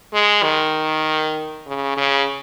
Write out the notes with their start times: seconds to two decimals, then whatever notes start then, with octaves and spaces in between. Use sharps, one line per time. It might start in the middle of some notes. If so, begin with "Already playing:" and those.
0.13 G#3
0.43 D#3
1.67 C#3
1.97 C#3